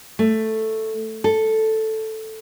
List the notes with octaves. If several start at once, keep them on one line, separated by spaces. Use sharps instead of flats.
A3
A4